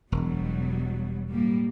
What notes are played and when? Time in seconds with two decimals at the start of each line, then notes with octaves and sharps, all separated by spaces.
0.12 E1 B2 F#3 G3
1.31 A2 G3 A#3